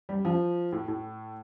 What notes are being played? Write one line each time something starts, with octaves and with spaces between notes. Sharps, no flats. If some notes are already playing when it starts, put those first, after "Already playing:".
G3
F3
A2
A2